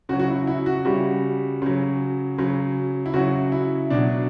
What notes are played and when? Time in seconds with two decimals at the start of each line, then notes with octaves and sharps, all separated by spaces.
0.09 C#3 F#4
0.13 F#3
0.19 F#4
0.28 E4
0.47 E4
0.66 F#4
0.85 C#3 G3 F#4
1.62 C#3 F#3
2.38 C#3 F#3
3.06 E4
3.14 C#3 F#3 F#4
3.52 E4
3.90 B2 F#3 D4